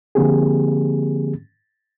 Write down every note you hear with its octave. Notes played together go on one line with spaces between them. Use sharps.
D3 F3 A#3 C4 G4 G#4